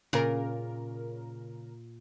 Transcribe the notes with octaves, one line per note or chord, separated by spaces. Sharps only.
A#2 C#3 A#4